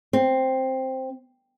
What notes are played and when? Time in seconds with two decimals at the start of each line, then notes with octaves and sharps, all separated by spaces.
0.13 C4